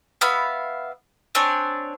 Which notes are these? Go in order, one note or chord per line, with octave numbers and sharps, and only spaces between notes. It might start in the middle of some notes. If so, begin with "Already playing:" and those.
B3 E5 F5 B5
C4 D4 C#5 G#5